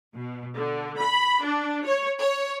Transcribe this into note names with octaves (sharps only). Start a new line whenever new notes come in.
B2
D3
B5
D4
C#5
C#5